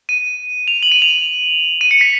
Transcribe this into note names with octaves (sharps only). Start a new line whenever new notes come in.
D#7
F7
F#7
D#7
F7
D#7
C#7
B6